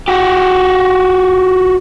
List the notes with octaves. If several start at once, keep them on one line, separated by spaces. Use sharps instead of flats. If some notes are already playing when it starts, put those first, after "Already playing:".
F#4 G4